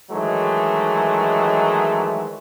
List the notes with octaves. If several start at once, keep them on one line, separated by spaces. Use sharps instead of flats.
D#3 E3 F#3 G#3 A3